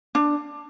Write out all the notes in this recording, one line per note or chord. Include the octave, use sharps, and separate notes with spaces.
D4